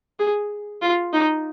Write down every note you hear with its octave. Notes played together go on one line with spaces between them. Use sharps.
G#4
F4
D#4